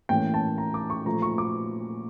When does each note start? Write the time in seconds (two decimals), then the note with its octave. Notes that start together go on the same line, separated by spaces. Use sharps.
0.09 A2 E3 A#3 C#4 G5
0.34 A5
0.58 A#5
0.74 D6
0.90 C#6
1.06 A#2 F3 A3 A#5
1.22 C#6
1.38 D6